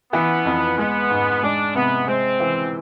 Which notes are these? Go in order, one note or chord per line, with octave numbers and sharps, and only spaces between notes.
E3 B3
F2
G#3 B3
G#2
G#3 D4
C3 B3
G#3 C4
E3